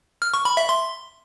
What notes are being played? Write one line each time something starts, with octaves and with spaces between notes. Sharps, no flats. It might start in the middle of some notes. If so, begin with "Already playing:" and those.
F6
C#6
B5
E5
C6